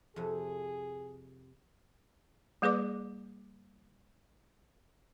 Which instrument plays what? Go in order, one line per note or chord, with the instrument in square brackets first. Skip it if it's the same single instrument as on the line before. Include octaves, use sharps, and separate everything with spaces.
[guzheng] F2 C3 [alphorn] G#4
[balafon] G3 A#3 G#4 B4 D5 D6